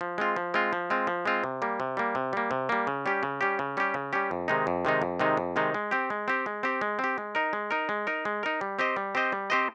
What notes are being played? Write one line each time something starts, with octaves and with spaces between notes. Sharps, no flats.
F3
G#3 C4 F4
F3
G#3 C4 F4
F3
G#3 C4 F4
F3
G#3 C4 F4
C3
G3 A#3
C3
G3 A#3
C3
G3 A#3
C3
G3 A#3
C#3
G3 C#4 G4
C#3
G3 C#4 G4
C#3
G3 C#4 G4
C#3
G3 C#4 G4
F2
C3 D#3 G#3 D#4
F2
C3 D#3 G#3 D#4
F2
C3 D#3 G#3 D#4
F2
C3 D#3 G#3 D#4
G#3
C4 G4
G#3
C4 G4
G#3
C4 G4
G#3
C4
G4
G#3
D#4 A#4
G#3
D#4 A#4
G#3
D#4 A#4
G#3
D#4 A#4
G3
C4 G4 C5 D#5
G3
C4 G4 C5 D#5
G3
C4 G4 C5 D#5